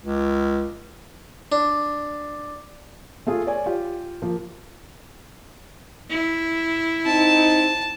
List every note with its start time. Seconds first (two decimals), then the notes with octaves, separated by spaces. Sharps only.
0.03 C#2
1.52 D4
3.27 A3 F4 G#4
3.47 C#5 D5 G#5
3.66 F4 G4
4.22 F3 A#3
6.10 E4
7.06 C4 D#4 A5